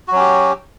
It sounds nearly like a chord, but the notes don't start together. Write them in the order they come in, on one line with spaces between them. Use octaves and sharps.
F#4 F#3 C#4 G4